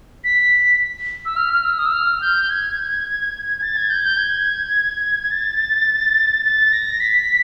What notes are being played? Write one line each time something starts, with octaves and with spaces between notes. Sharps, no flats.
B6
E6
F6
F6
E6
D#6
E6
F6
G6
G#6
A6
G#6
G6
G6
G#6
A6
A6
A#6
B6